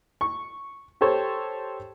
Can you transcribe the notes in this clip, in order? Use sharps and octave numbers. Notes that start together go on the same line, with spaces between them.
C#6
G4 A4 C5 C#5